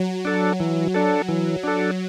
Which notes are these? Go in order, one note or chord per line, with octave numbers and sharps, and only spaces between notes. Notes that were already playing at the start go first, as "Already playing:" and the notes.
Already playing: F#3
D4 A4
E3
D4 A4
E3
D4 A4